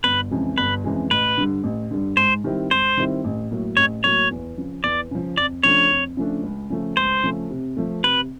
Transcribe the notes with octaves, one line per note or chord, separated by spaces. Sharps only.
G1 B4
F2 C#3 E3 G#3
G1 B4
F2 C#3 E3 G#3
A1 B4
G2 D3
A1
G2 D3
G#2 C5
D#3 G3 C4 E4
G#2 C5
D#3 G3 C4 E4
A1
A2 F#3 A#3
A1 C#5
A2 F#3 A#3 C#5
E2
C#3 F3
E2 D5
C#3 F3
F2 D5
C#3 F3 A3 D4 C#5
F2
C#3 F3 A3 D4
C#2
C#3 F3 A3
C#2 C5
C#3 F3 A3
C3
F3 A3
C3 B4